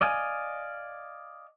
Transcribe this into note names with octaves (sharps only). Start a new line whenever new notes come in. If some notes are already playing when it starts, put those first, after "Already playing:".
D5 D#5 F5 G#5